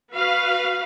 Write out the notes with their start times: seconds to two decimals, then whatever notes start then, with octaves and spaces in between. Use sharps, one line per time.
0.14 F#4 B4 F5